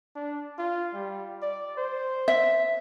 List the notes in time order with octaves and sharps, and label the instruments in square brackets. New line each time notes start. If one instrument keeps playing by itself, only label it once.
[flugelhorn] D4
F4
G3
D5
C5
[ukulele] E5